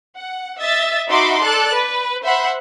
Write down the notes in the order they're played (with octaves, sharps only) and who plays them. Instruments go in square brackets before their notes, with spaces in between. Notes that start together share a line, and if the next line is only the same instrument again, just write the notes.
[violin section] F#5
D#5 E5 A6
D#4 F#4 E5 B5 C6 D6
A4 D5 A5 F#6
B4
C5 E5 F#5 B5